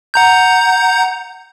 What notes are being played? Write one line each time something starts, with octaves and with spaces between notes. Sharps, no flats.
F#5 A#5 G6